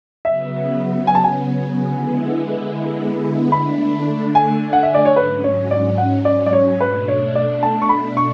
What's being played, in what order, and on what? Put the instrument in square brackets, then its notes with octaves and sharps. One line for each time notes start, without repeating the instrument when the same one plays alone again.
[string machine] C#3 F#3 B3 [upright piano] E5
[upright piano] G#5
A5
G#5
[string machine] D3 G#3 B3 E4
[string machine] D3 A3 D4 [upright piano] B5
[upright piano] G#5
F#5
E5
D5
C#5
[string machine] G#2 F#3 C#4 [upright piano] B4
[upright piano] C#5
D5
F#5
D5
D5
C#5
[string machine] B2 A3 D4 [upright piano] B4
[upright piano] C#5
D5
A5
C#6
B5
C#6